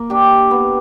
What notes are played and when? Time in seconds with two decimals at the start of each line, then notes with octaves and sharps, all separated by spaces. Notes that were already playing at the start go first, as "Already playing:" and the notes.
Already playing: A#3
0.10 D4 G4
0.51 B3